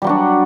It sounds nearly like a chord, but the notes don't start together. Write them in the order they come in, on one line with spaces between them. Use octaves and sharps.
G3 F#3 F#4 D4